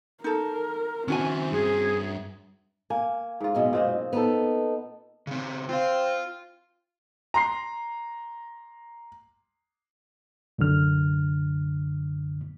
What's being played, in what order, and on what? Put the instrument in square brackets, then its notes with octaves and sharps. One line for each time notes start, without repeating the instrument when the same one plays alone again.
[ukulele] D#4 A4 [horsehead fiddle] A#4
[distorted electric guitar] D#3 E4 [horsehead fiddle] C4 [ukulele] C#4 F#4 G#5
[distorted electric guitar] G2 E5 [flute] G#4
[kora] A#3 [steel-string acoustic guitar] G#5
[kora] G#2 F4
[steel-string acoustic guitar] F#2 B2 G#3
[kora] A#2 C4 D#5
[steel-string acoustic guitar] B3 D#4 A4
[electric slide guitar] C#3 C4
[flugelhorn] C4 [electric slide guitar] F4 F5
[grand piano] A#5 C6 C7
[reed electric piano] C2 F#2 D3 F6